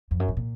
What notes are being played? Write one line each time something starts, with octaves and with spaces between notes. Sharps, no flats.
F2
F#2
G#2
A#2